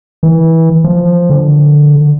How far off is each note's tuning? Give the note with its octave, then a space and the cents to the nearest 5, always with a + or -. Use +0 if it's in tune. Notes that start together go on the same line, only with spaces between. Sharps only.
E3 -20
F3 +0
D3 +0